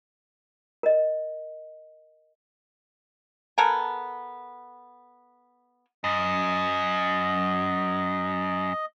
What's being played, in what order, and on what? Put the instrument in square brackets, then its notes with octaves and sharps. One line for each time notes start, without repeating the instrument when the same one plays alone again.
[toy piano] A#4 D#5
[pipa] B3 A4 A#4 G#5
[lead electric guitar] F#2 [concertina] D#5